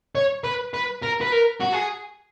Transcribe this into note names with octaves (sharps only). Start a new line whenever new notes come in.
C#5
B4
B4
A#4
B4
A#4
F#4
G#4